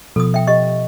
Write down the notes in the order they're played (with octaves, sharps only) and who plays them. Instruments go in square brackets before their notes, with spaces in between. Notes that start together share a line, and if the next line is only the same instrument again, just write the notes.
[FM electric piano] B2 F3 [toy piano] A4 D#6
[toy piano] E5 G5
G4 D#5 C#6